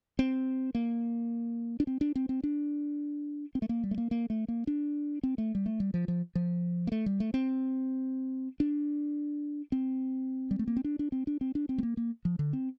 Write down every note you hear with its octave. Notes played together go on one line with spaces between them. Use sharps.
C4
A#3
D4
C4
D4
C4
C4
D4
C4
A3
A#3
G3
A3
A#3
A#3
A3
A#3
D4
C4
A3
G3
A3
G3
F3
F3
F3
A#3
A3
G3
A3
C4
D4
C4
G3
A3
A#3
C4
D4
D4
C4
D4
C4
D4
C4
A3
A#3
A#3
F3
D3
C4